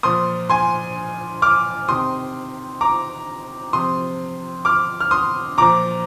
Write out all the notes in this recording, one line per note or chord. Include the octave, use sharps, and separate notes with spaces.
A#2 F3 C6 D#6
G#5 C6
D6 F6
C3 D#3 C6 D#6
A#5 D6
C3 F3 C6 D#6
D6 F6
F6
C6 D#6
A#2 F3 A#5 D6